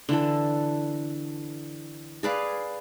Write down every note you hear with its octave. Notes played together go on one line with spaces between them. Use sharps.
D3 E3 A4
G#4 B4 D5 F5